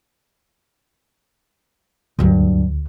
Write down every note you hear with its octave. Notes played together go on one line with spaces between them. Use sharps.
D2 G2 F#3